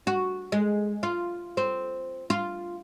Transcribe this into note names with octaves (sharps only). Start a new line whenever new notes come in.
F#4
G#3
F4
C4
F4